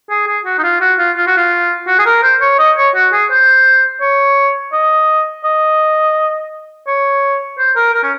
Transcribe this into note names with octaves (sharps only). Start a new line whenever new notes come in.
G#4
G#4
F#4
D#4
F4
F#4
F4
F4
F#4
F4
F#4
G#4
A#4
C5
C#5
D#5
C#5
F#4
G#4
C5
C#5
D#5
D#5
C#5
C5
A#4
A#4
C#4